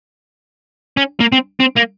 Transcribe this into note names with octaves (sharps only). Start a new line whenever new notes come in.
C#4
A#3
C4
C4
A#3